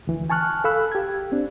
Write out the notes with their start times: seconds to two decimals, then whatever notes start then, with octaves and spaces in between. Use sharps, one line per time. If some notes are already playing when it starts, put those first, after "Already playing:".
0.07 D2 E3
0.30 G#5 A5 C#6 F6 F#6
0.64 A4 F5 B5 E6 F#6
0.92 G4 G#6
1.32 C4 D4